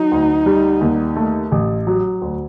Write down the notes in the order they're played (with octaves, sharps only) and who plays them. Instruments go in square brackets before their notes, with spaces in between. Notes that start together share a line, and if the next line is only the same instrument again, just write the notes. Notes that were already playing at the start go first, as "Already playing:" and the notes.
Already playing: [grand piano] F#3 [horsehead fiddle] D#4
[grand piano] D2
G3
D#2
A3
A1
F#3
D2